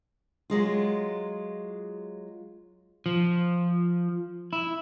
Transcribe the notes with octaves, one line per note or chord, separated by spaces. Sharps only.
F#3 G#3 F4
F3
E4